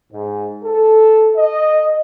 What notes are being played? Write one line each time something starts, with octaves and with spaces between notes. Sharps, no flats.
G#2
A4
D#5